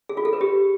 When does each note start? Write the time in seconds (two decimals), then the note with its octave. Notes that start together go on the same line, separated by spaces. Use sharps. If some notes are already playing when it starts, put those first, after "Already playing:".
0.09 G#4
0.17 F4
0.25 A4
0.33 B4
0.41 G4